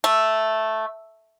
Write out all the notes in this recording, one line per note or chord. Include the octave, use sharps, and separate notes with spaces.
A3